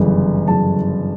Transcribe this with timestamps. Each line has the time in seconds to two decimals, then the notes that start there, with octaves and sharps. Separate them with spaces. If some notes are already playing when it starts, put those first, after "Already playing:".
Already playing: G1 F#2 C#3 E3
0.48 G1 F#2 C#3 E3 A5